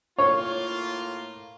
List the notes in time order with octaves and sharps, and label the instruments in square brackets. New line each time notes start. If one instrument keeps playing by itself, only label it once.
[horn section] A2 A#3 F4 [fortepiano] C#5